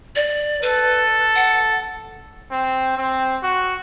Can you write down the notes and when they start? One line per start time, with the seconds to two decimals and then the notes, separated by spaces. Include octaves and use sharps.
0.16 D5
0.62 A4 B4
1.36 F#5
2.52 C4
2.98 C4
3.43 F#4